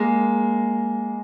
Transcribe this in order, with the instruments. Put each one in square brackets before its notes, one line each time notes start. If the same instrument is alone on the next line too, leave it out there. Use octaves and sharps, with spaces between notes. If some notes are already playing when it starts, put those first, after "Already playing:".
Already playing: [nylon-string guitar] G#3 A#3